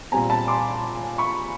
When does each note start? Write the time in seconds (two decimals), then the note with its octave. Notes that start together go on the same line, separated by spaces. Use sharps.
0.12 A#2 G3 C4 G#5 A#5
0.30 A5 B5
0.48 C6 D6
1.18 B5 C#6